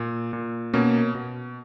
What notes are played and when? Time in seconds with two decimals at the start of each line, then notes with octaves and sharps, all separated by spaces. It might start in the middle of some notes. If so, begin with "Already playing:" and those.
Already playing: A#2
0.33 A#2
0.73 B2 A#3 C#4
1.15 B2